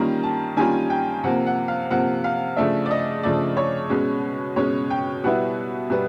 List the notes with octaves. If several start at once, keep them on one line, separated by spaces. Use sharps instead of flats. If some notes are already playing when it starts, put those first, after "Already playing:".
Already playing: D#3 G3 A#3 C#4 F4 A#5
A5
D#3 G3 A#3 C#4 F4 G#5
G5
C3 F3 A#3 F#5
F#5
F5
C3 F3 A#3 F#5
F5
C#3 F3 A3 D4 E5
D5
D#5
C#3 F3 A3 D4 D5
C#5
B2 G#3 C#4
B2 G#3 C#4 C#5
G5
B2 G3 B3 E4 F#5
B2 G3 B3